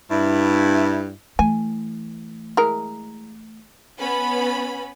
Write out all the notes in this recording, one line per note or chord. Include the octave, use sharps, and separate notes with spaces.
G2 E4
E3 A3 G#5
G#3 E4 A#4
B3 C#4 B5